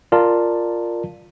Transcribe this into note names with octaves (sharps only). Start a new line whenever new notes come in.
F4 A#4 D5 A5